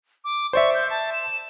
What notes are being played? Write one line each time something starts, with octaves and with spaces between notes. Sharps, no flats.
D6
C5 D5 E5 C#6
G6
A5
E7